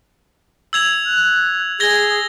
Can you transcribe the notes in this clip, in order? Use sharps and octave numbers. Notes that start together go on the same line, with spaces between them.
E6 G#6 F7
F#6
G#4 G#6 A#6 G7